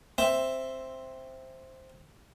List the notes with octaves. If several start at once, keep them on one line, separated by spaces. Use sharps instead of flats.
C4 E5